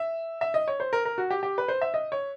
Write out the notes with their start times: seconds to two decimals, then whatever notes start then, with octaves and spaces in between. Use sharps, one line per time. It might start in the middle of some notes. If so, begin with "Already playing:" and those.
Already playing: E5
0.41 E5
0.54 D#5
0.68 C#5
0.80 C5
0.93 A#4
1.05 A#4
1.18 F#4
1.31 G4
1.43 G4
1.58 B4
1.68 C5
1.81 E5
1.94 D#5
2.12 C#5